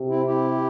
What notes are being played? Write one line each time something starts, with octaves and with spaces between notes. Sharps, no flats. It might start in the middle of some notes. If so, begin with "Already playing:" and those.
Already playing: C3
C4 E4
E4 G4